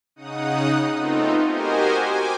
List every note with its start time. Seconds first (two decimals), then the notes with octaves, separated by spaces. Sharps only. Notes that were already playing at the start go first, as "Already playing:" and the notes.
0.16 C#3 D#4 F#5 D#6
0.95 A3 B3 C4 D#4 F4
1.46 F#4 G4 A#4 C5 D#5 G#5
2.03 G5 G#5 D6